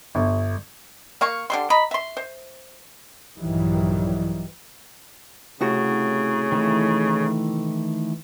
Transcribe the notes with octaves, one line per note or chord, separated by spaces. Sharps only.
G1
A#3 F5 C#6
D3 G3 C6
D#5 A#5 B5
E5 C6
C5
A#1 G2 D#3 E3 F#3 G3
C2 A2 C#3 F#4
D#3 E3 A3